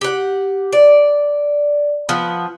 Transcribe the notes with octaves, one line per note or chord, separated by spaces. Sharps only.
G4 F#5
D5
F3 B3